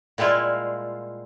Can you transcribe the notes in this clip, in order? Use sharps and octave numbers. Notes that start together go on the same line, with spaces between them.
A#2 G3 G#3 E4 F4